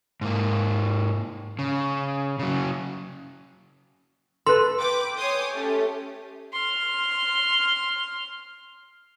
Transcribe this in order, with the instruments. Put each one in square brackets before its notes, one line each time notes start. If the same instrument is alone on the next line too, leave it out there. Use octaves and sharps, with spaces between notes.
[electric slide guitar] G#2 A#3
C#3
C#3 F#3
[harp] A4 B4 [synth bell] C6
[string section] B4 G5 D6
C#5 G#5 C6 D6 D#6 G6
A3 C#4 G4
[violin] C6 F6